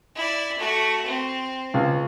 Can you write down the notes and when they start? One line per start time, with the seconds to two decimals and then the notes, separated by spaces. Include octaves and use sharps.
0.15 E4 D5
0.58 A3 F#4
1.05 C4
1.74 C#2